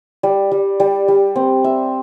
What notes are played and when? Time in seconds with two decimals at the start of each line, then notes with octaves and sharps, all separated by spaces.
0.23 G3
0.52 G3
0.80 G3
1.08 G3
1.36 C4
1.64 E5